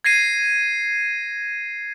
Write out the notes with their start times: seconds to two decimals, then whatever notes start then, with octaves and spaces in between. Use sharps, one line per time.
0.04 G#6 A#6 C7 D#7